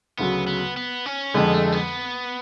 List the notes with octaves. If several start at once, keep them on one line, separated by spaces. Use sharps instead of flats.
D2 C#3 F#3 B3
B3
B3
C#4
F2 D3 G#3 B3
A3
B3